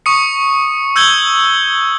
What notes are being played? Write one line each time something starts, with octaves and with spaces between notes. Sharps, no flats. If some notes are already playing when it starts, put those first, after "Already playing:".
C#6 D#6 C#7
E6 G6 G#6 G7